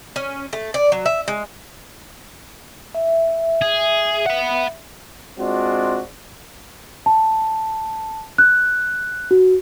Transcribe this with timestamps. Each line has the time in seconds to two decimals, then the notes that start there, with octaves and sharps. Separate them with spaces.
0.16 C#4
0.53 A3
0.74 D5
0.92 F#3
1.06 E5
1.28 G#3
2.95 E5
3.62 G#4
4.26 F#5 B5
5.38 G#3 C4 D4 F4 F#4
7.06 A5
8.38 F#6
9.31 F#4